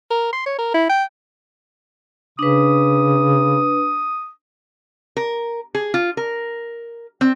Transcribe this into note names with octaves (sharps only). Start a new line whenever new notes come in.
A#4
C6
C#5
A#4
E4
G5
C#3 D4 B4 D#6
A#4
G#4
F4
A#4
C4